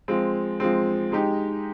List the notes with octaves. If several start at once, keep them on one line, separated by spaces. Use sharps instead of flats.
F3 G#3 C4
F3 G#3 C4
G#3 D#4 G4